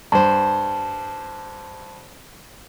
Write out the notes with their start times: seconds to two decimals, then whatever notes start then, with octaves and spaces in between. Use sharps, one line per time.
0.12 G2 C5 A5